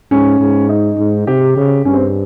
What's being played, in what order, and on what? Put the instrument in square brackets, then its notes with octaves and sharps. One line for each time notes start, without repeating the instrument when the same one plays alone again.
[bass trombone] G#2 [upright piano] C#4
[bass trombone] G#2
[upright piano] D#4
[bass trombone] G#2
[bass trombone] C3 [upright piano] G4
[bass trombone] C#3
[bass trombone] G2 [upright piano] C#4
[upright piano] C4